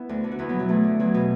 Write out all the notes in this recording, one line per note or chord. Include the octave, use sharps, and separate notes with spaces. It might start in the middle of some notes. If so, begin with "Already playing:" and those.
Already playing: B3 E4
D2
D3
F#4
E2 B3 E4
B2 F#3 B3
F#3
E2 A3
D3
E2 F#3
B2